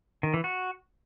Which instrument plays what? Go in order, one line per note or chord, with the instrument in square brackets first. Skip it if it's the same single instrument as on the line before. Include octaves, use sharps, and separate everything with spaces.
[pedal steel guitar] D#3
E3
F#4